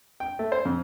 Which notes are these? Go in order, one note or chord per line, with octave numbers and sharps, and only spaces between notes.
G5
A3
C5
F2